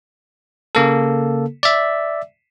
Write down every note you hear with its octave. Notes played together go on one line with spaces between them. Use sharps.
C#3 A#3 A4
D5 E5